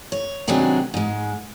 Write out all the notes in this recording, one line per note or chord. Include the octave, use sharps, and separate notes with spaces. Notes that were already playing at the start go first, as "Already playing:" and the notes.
C#5
C3 D#3 F#3 G#3 B3 D4
G#2 G#3